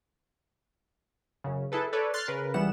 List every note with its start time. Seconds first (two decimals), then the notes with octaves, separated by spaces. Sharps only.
1.44 F#2 C#3
1.72 E4 G#4 A4 B4
1.93 A4 B4 C#5 D5
2.14 C6 F6 F#6 A6 C7
2.28 C#3 A#4 B4
2.54 C#2 E3 G3 B3 F#5 E7